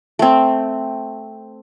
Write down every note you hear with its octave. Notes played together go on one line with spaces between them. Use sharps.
A3 C4